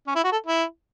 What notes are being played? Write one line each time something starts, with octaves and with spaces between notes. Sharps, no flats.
C#4
E4
F#4
A4
E4